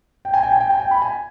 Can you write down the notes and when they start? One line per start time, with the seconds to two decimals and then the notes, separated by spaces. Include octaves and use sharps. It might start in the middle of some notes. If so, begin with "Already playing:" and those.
0.25 G5
0.34 G#5
0.43 G5
0.52 G#5
0.60 G5
0.70 G#5
0.79 G5
0.91 B5
1.02 G#5